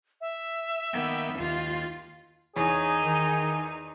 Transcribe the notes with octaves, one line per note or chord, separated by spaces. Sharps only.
E5
D#3 A#3 B3 G5
D#2 D#3 F4
E2 D#4 G#4 C#5
D#3